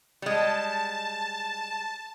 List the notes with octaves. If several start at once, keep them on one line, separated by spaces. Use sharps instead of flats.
G3 G#3 A5